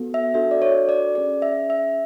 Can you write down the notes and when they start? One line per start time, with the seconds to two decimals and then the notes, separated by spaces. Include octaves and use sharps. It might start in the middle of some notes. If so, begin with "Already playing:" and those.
Already playing: B3 F#4 A4
0.14 E5
0.34 D4 F#4 A4 E5
0.51 D5
0.62 C#5
0.89 D5
1.15 C#4 G#4 D5
1.42 E5
1.70 E5